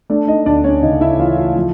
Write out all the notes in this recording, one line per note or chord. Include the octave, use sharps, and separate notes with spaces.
A3 D4 D5
D#4 D#5
D2 D4 D5
C#4 C#5
C#3 D#4 D#5
E4 E5
E3 F4 F5
F4 F5
F3